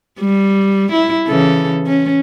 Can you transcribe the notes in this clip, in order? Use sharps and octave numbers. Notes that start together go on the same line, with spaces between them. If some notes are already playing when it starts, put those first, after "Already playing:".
G3
E4
C#3 E3 A4
C#4